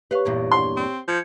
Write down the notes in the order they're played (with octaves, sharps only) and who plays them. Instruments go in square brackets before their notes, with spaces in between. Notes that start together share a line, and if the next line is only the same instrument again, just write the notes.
[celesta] G4 C#5 C#6 [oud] B4 F5
[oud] E2 G2 A#2
[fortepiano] C6
[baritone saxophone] C4
[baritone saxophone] F3 [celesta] G6 G#6 C#7